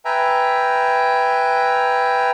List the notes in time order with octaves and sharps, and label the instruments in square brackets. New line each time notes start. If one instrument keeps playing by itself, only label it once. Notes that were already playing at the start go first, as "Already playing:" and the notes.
[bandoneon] B4 E5 G5 G#5 A#5